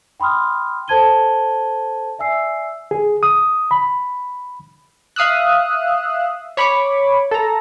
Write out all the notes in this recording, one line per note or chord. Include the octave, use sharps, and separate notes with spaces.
G5 B5 C6 D#6 F6
A4 C5 A5 G#6 D#7 G7
D5 E5 G#5 E6 C7
G#4
D#6
B5
E5 F5 D#6 E6 F#6
C#5 B5 C#6 D6
A4 A#5